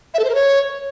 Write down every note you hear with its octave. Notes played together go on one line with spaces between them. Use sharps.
E5
A4
C5
A#4
C#5